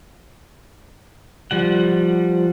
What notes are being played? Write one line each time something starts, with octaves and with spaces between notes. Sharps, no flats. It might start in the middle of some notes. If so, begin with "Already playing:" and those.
F3 G3 F#5